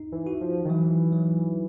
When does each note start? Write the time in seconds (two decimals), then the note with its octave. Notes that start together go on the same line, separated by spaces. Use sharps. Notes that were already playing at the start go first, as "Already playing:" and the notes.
Already playing: D#4
0.12 E3
0.27 F#4
0.41 F3
0.65 D#3
0.70 E3 F#3
1.12 F#3